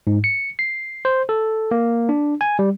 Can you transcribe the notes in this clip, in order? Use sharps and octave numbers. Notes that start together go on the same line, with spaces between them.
G#2
C#7
C7
C5
A4
A#3
D4
G#5
G3